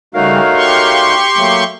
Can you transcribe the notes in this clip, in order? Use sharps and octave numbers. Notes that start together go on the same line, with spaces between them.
C#3 G3 A3 D#4 F#4 A#4 C#5 F5
G4 C6 C#6
F#3 A3 A#3